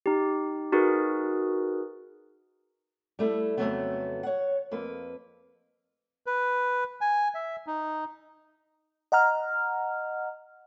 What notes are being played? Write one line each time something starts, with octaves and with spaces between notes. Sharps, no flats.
D#4 G4
D#4 F#4 G#4 A#4 B4
G3 A3 E4 A4
F2 A2 C#3 F#3 A3 B3
C#5 F#5
F2 A#3 B4
B4
G#5
E5
D#4
D#5 F#5 A#5 F6